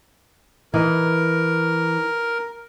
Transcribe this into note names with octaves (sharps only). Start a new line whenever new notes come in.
E3 A#4 D#5